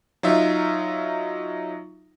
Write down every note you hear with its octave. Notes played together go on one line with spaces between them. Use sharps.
F#3 D#4 F4 E5